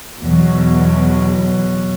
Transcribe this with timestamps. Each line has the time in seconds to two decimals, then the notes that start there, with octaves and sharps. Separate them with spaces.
0.20 E2 B2 F#3